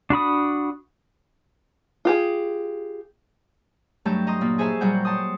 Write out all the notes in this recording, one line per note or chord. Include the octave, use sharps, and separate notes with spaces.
D4 F#4 B5 D#6
F4 G4 G#4
G2 F#3 A3 A5 G6
D#5 A#5 C6 D#6
A#2 A#3
D#4 G#4 C5 C#5 E5 A5
A#2 F#3 G3 F#4 F#5 G6
F#5 A5 C6 D#6